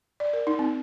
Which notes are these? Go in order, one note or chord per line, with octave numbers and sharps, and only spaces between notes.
D5
A#4
D#4
C4